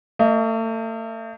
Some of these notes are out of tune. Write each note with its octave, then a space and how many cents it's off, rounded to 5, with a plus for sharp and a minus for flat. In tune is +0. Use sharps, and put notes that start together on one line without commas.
A3 +40 D#5 +10